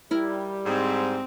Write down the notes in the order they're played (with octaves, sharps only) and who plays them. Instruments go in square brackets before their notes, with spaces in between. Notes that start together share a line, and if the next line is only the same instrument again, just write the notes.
[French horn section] G3 [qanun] E4 A#4
[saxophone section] G#2 [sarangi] C4